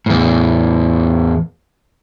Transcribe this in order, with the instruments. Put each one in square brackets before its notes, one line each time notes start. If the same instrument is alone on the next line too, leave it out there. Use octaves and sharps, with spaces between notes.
[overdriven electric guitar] E2 A2